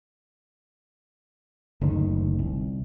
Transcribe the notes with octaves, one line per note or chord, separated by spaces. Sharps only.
F#1 D2 D#3
C2